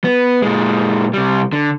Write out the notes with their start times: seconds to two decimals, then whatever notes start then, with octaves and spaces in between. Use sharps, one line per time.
0.04 B3
0.42 A#2 G#3
1.14 C3 G3
1.53 D3